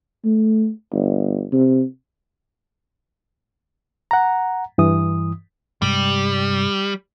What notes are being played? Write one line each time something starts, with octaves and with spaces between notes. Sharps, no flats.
A3
G1
C3
F#5 A#5
G2 E3 D#6
G2 C3 G3 G#3